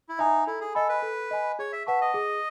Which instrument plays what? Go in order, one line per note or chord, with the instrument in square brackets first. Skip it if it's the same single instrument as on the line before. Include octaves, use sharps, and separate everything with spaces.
[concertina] E4
[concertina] D#4 [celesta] E5 G#5
[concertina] E4 [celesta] A4
[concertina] G#4
[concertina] A4 [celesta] D#5 G#5 B5
[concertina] B4
[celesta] A4
D#5 G#5 B5
[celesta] G#4 [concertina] C#5
[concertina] E5
[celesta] B4 F#5 A5 C#6 [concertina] E5
[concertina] D#5
[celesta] G#4